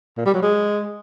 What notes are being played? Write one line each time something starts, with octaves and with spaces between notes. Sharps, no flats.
A#2
G3
F#3
G#3